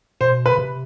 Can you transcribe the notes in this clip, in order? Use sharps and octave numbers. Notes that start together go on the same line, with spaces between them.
B2 C5
B4
C#3
C3